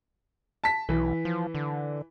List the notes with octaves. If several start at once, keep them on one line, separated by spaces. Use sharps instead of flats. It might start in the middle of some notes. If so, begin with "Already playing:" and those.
A5 B6
B1 E3
F3
D3